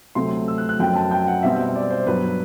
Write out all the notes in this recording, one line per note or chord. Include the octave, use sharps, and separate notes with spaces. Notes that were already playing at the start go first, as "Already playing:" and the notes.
D2 C3 F#3 A3 C4 C6
E6
F#6
F#6
F#2 F#3 C4 G5
A5
G5
F#5
B2 G3 C4 E5
D5
C5
G2 F#3 B3 B4